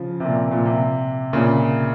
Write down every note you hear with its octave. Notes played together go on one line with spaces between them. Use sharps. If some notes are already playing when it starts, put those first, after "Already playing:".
Already playing: C#3 F3
C3
A#2
C3
A#2
C3
A#2 C#3